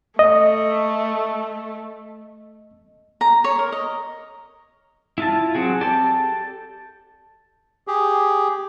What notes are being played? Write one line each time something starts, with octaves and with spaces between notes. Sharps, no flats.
A3 D#5
A#5
C#5
A#4
D#5
E4 F4 A5
F#3 C4 F#4 G#4
G4 A4 D5 A5
G4 G#4